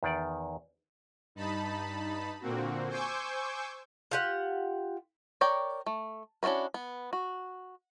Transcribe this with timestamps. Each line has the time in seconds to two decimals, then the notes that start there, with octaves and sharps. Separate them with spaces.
0.03 E2 D#3 D5
1.35 G2 D#4 A5 B5
2.41 A#2 D3 A#3 C4 F#4
2.89 C5 G#5 C#6 D6 E6 G6
4.11 F4 G4 F#5
5.41 A#4 C#5 D5 G5
5.86 A3
6.43 C#4 D4 E4 F#4 B4
6.74 B3
7.13 F#4